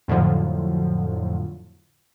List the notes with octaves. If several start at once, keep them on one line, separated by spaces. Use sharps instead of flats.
F2 A2 D3 F3 F#3